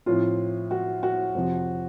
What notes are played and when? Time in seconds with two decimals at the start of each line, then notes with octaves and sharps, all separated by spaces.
0.06 A2 F3 C4 F4
0.71 F#4
1.03 F#4
1.35 F2 C3 F3